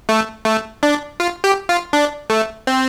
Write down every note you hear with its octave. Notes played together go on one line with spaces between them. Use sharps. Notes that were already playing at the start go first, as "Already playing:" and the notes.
A3
A3
D4
F4
G4
F4
D4
A3
C4